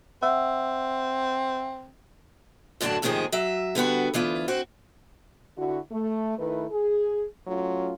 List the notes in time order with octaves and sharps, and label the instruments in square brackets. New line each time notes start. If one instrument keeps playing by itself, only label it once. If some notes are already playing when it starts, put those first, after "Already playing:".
[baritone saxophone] C4 [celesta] E5 F#5 E6
[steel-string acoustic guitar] F#2 A2 D3 D4 F#4 A5
D#2 A2 C3 D#3 F3 G#4
F#3 E5
D3 G3 B3 F#4
D2 E3 B3 F4
C4 F#4 C5
[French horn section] D3 E4 F#4
A3
D#3 A3 E4 B4
G#4
F#3 A3 C#4 F4